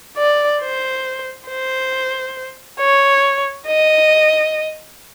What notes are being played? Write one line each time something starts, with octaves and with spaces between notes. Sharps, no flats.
D5
C5
C5
C#5
D#5